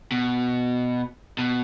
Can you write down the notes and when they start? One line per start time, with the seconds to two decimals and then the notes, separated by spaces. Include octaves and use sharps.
0.12 B2
1.39 B2